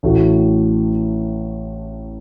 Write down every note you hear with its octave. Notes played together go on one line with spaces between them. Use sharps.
A1 A2 A3 F#4